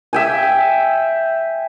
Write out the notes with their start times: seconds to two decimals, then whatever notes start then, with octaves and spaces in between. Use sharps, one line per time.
0.13 E5 G5 G#5